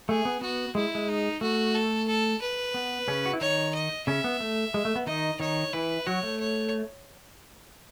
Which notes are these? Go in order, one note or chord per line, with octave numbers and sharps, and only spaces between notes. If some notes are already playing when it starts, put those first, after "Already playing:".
A3 G#4
B3
B3 F#4
G#3 E4
G#3
D#4
A3 F#4
A4
A4
B4
B3
C#3 C#4
F#4
E4
D#3 D#4 C#5
D#5
C#3 C#4 E5
B3
A3
G#3
A3
B3
D#3 D#4 D#5
D#3 D#4 C#5
E3 E4 B4
F#3 F#4 C#5
A3
C#5